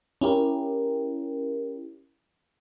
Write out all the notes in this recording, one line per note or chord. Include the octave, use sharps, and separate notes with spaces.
C#4 E4 G4 A#4